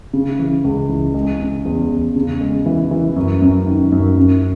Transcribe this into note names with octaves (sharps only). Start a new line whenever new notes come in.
C#3
E3
C#2
E3
G#3
C#3
E2
E2
C#3
G#3
E3
E3
F#2
F#2
D#3
F#2
F#2